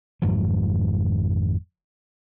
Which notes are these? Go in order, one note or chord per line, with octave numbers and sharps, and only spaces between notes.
G#1 F2 G#2 F#3